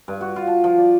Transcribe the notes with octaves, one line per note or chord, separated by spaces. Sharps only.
G2
F#4
F4
A5
F3
D5